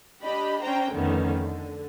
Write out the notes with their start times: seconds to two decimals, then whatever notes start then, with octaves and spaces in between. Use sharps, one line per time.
0.22 D4 G4 D#5 B5
0.63 C#4 D4 C5 G5 A#5
0.92 F2 D3 D#3 A3 B3 C#4
1.41 D3